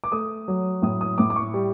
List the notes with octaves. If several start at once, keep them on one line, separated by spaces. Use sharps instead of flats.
D6
A3 D#6
F#3
A2 D#6
D#6
A2 D6
D6
C#6
G3